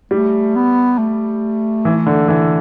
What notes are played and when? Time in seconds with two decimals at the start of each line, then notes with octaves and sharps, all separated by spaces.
0.11 G3 A3
0.55 B3
0.98 A3
1.85 E3
2.06 D3
2.28 E3